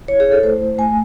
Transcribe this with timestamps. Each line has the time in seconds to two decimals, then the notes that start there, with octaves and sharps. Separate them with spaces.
0.08 E4 C#5
0.20 G#4
0.31 A4
0.43 A3 C5
0.78 A3 G#5